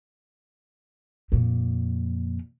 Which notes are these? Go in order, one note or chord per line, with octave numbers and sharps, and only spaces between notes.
F2 A#2